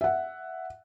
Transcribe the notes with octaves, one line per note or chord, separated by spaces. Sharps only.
E5 F#5